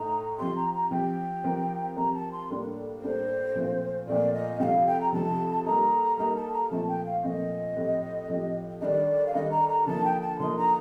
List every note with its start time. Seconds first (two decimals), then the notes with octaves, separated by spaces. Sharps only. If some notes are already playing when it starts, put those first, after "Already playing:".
Already playing: A2 A3 D#4 A#5
0.38 F3 C4 G4 C6
0.56 A#5
0.74 A#5
0.91 F3 C4 G4 G5
1.44 F3 C4 G4 A#4
1.96 F3 C4 G4 A#4 A#5
2.14 A5
2.32 C6
2.49 A2 G3 A#3 D4 A4
3.01 A2 G3 A#3 D4 A4 C5
3.55 A#2 F3 A3 C4 F4
4.07 A#2 F3 A3 C4 F4 D5
4.34 D#5
4.60 F2 C3 F3 F5 G5
4.87 G5
5.01 A#5
5.13 F2 C3 F3 A5
5.65 G3 A#3 D#4 A4 A#5
6.18 G3 A#3 D#4 A4 A#5
6.36 A5
6.53 A#5
6.70 A#2 F3 A3 C4 A5
6.88 G5
7.06 F5
7.23 A#2 F3 A3 C4 D#5
7.76 A2 F3 C4 G4
8.29 A2 F3 C4 G4
8.81 D#3 G3 D4 A4 D5 D#5
9.26 F5
9.34 D#3 G3 D4 A4 D#5
9.51 A#5
9.69 A#5
9.86 D3 F3 A#3 D#4 A5
10.04 G5
10.21 A5
10.39 D3 F3 A#3 D#4 C6
10.57 A#5